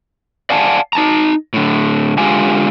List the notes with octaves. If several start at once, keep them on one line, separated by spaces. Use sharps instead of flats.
D5 F5 F#5 G#5 A5
D#4 A5 A#5
A2 D3
D3 G#3 F4 G4 F5 G#5